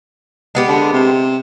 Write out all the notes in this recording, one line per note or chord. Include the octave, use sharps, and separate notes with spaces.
G#3 B3 G4
D3
C3